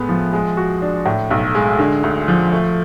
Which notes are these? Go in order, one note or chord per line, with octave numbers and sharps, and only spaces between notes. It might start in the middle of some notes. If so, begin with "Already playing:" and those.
Already playing: A2 G#3 B3
F3
G#3
F#4
D4
A2
B1
G#3
D3
D2
F3
A3